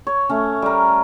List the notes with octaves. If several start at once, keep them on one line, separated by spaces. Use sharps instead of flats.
C#5
A3 C#4
G3 A#4